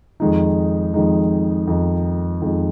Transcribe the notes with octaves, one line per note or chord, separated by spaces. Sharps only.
F2 D#3 G#3 D#4
F2 D#3 G#3 D#4
F2 D#3 G#3 D#4
F2 D#3 G#3 D#4